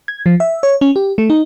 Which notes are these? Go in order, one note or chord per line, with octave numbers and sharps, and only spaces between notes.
G#6
F3
E5
C#5
C#4
G4
A3
D#4